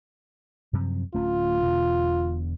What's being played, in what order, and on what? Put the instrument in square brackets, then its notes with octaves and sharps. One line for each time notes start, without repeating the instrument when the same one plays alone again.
[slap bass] F#2 C3 F3
[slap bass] D1 A3 C#4 [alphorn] F4
[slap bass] E1 B2 D3